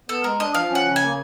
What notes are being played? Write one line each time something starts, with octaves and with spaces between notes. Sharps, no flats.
B3 A4
G#3 A#4
D4 D#5
F3 F5
C#4 F#5
C#3
G#5
A#3